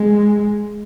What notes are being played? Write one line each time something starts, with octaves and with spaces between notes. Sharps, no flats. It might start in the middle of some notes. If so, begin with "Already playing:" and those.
Already playing: G#3